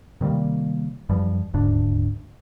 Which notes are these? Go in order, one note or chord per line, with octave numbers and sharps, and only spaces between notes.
C3 D#3 G3 A#3
F#2 E3 F3 G3
D#1 D2 G#2 D4